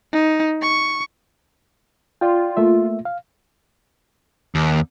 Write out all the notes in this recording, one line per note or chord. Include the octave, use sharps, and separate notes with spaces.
D#4
C#6
F4 D5 F5 G5
A3 A#3 E5
F5
D#2